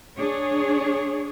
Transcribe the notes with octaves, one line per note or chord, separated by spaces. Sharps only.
D4 G#4 C#5